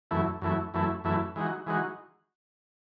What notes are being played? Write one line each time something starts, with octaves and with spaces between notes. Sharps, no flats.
F#2 E3 A3 E4
F#2 E3 A3 E4
F#2 E3 A3 E4
F#2 E3 A3 E4
E3 G#3 D#4 F#4
E3 G#3 D#4 F#4